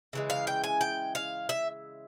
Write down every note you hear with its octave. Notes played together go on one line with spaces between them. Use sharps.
C#3 E3 G#3
F5
G5
G#5
G5
F5
E5